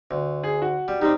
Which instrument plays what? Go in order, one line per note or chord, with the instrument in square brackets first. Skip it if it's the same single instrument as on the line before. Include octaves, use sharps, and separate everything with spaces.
[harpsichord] D2
[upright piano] G#4
F#4
[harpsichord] G3
[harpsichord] G3 C4 [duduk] D#4 [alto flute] G4